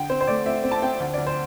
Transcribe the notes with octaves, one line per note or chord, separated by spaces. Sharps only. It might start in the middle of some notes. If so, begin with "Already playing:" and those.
Already playing: D3 G5
C4 C5
C5
A3 D5
C4 E5
C4
A5
C4 G5
D2
D2 D5
C5